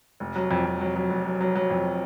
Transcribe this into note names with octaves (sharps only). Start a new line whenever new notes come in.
F1
F#3
F2
F2
F#3
F#3
F1
F#3
F#3
F#3
F2